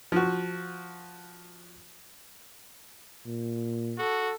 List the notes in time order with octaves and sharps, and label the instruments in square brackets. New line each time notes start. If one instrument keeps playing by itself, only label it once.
[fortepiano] F3 F#4
[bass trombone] A#2
[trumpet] F#4 [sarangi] A4